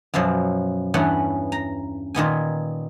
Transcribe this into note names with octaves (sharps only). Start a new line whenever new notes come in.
F#2 B2 F3 F#3
E2 G2 B3 C#4 F#5
A#5
A#2 D#3 B3 G#5